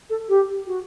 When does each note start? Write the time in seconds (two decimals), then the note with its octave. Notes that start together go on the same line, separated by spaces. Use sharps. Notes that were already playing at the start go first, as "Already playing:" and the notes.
0.10 A4
0.29 G4
0.67 F#4